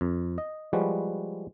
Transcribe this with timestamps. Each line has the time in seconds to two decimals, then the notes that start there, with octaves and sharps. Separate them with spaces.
0.01 F2
0.38 D#5
0.73 F3 G3 G#3 F#4 B4